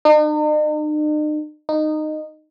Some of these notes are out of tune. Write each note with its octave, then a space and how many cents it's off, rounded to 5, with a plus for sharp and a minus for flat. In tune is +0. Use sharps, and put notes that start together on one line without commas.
D#4 -45
D#4 -15